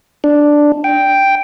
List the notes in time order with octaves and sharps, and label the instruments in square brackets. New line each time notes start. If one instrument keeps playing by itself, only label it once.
[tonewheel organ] D4
G5